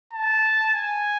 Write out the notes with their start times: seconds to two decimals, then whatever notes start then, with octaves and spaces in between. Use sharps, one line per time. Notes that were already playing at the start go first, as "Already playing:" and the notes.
0.13 A5
0.74 G#5